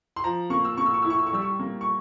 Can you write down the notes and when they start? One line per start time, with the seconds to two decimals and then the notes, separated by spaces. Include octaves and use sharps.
0.16 C6
0.24 F3 A#5
0.50 A#3 C#6
0.65 E6
0.77 A#3 C#6
0.86 E6
0.94 C#6
1.02 E4 E6
1.10 C#6
1.19 E6
1.27 C#6
1.33 G3 E6
1.42 C#6
1.59 A#3
1.81 C#6